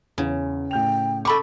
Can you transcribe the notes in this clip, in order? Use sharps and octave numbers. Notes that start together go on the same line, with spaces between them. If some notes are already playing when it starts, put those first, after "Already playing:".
E2 C#3
A2 G5 G6 F7
A4 A5 B5 C#6 D6